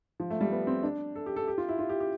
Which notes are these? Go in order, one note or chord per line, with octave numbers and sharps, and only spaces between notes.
F3
A3
G3
B3
C4
D4
A4
G4
A4
G4
F4
E4
F4
G4
G4